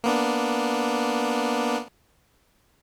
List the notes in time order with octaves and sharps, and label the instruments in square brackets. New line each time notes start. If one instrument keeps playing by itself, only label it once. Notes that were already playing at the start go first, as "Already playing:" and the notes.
[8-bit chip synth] A#3 B3 D4